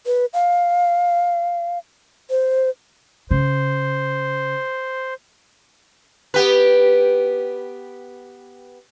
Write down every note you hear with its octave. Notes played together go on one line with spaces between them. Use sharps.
B4
F5
C5
C#3 C5
B3 G4 B4